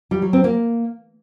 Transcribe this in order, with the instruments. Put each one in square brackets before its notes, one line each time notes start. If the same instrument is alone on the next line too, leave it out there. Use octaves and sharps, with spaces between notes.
[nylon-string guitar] G3
F#3
C4
A#3